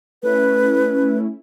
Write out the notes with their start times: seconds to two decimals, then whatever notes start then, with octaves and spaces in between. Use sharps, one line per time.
0.23 A3 C#4 E4 B4